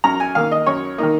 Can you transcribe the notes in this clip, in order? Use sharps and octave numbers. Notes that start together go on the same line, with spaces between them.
F#2 A#5
G#5
D#3 A#3 F5
D#5
F#2 C#5
D#3 A#3 D#4